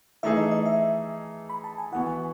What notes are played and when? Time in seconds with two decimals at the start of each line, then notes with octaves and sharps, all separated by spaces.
0.23 E3 A3 D#4 G#4 E5
0.37 D#5
0.51 D#5
0.66 E5
1.50 B5
1.64 A5
1.78 G#5
1.92 E3 B3 F#4 F#5
2.07 G#5